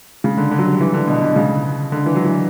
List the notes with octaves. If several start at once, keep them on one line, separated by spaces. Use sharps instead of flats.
C#3
D3
D3
F#3
G3
E3
D3
B2
B2
C#3
D3
E3
F#3
E3